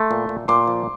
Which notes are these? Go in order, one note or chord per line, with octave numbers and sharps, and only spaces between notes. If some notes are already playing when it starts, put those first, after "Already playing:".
Already playing: A3 C6
A#2
A#2
A#2 C6 D6
F3